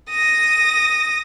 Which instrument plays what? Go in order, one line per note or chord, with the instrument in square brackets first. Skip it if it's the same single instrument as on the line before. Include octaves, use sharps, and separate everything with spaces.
[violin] D#6 A#6